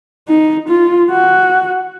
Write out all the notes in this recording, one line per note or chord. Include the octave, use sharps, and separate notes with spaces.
D#4
F4
F#4